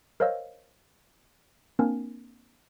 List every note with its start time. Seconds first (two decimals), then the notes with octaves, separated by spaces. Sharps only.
0.20 A#4 C5 C#5 D#5 F5 E6
1.79 A#3 C4 D4 A#4 G#5